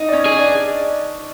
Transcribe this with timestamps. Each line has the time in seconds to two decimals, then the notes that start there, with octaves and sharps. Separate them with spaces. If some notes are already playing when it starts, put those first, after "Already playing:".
Already playing: D#4 D#5
0.09 D5
0.12 C#4 C#5
0.26 G#4
0.38 D4 D5